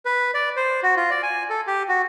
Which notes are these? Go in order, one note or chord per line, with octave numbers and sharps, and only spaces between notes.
B4
D5
C5
F#4
F4
D5
G#5
A4
G4
F#4